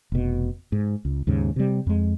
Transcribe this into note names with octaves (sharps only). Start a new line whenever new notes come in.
F1 B2
G#2
C#2
D#2 G#2 C#3
C3 G3
F2 G#3